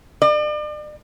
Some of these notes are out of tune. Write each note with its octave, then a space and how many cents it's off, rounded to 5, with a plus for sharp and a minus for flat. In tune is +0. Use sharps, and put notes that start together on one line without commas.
D5 +40